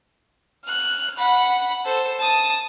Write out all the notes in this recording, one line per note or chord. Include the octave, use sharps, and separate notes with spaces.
F6 F#6
F#5 B5
A4 C5
A5 D#6